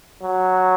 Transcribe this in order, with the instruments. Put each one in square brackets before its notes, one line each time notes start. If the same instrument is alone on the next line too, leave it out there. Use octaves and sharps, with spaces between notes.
[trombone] F#3